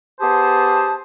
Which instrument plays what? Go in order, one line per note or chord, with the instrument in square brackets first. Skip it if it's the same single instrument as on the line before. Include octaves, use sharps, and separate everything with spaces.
[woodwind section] B3 G4 G#4 C5 A5